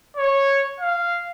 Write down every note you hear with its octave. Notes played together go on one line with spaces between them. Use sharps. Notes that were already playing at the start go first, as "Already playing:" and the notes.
C#5
F5